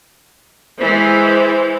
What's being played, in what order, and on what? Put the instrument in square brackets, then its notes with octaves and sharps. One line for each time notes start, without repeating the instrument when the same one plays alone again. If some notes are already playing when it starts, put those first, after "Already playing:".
[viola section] E3 G#3 [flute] C5